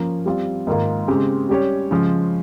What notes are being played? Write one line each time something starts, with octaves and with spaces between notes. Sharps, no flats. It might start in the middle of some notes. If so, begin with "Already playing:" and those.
Already playing: F3 A#3 C#4
G3 C4 F4
G#2 D#3 A#3 F4 A#4
C#3 G#3 C4 G4
G3 C#4 G4 C#5
C#3 F3 G#3